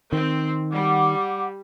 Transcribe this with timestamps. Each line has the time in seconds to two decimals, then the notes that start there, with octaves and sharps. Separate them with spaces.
0.13 D#3 C4
0.71 G3 F#5 D6